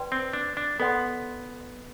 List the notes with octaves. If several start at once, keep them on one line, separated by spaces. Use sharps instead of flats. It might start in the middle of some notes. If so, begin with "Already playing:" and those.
Already playing: B4 D5 G5 C6
C4
D4
D4
B3 A4 D5 F#5 C6